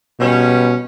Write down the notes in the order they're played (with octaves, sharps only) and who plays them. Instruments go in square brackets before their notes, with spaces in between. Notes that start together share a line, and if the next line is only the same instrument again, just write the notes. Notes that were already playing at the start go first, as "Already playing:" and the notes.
[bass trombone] B2 [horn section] G3 C#4